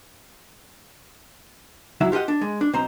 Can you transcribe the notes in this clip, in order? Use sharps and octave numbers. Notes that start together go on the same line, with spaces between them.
C#2 F#3 E4 E5
F4 G4 A#4 D#5 F#5
D4
G#3
D4
B1 C4 C5 A#5